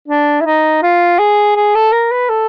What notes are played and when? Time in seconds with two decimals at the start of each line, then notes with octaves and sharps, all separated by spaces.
0.08 D4
0.41 E4
0.46 D#4
0.83 F4
1.19 G#4
1.56 G#4
1.75 A4
1.92 A#4
2.11 B4
2.29 A4